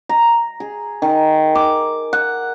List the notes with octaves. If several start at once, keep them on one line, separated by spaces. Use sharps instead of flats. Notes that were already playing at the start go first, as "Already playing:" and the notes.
A#5
G#4
D#3
D6
F#5